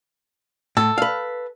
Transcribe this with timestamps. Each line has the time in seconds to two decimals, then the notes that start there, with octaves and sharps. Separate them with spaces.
0.77 A2 A4
0.98 B4 F5